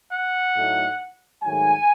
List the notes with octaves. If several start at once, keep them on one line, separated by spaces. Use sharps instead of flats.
F#5
A2 F#3 A3 D#4
G#2 D#3 F#3 A3 G#5